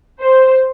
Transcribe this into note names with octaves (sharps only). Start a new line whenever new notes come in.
C5